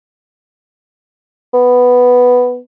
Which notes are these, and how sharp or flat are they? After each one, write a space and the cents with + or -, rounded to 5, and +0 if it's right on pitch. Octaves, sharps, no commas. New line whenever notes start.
B3 +0